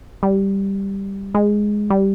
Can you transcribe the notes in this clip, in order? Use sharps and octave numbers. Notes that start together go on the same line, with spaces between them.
G3
G#3
G3